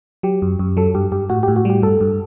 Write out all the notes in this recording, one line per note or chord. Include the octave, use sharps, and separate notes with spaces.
F#3 G4
F#2
F#2
F#3 A4
G2 G4
G2 G4
A2 F#4
G4
A2
F#4
G3 G4
G2 A4
G2